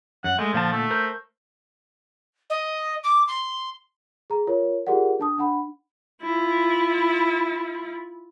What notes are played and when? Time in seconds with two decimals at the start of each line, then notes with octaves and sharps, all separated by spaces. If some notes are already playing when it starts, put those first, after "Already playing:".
0.24 F#2 F#5
0.39 G#3 A3
0.54 A#2 D3 F3 A5
0.72 A3
0.91 A#4 C5
2.50 D#5
3.04 D6
3.28 C6
4.30 G#4 A#5
4.47 F4 A#4 C#5
4.87 F4 G4 G#4 A#4 D5 F#5
5.19 D4 A5 D#6
5.38 D4 F#5 B5
6.22 E4 F4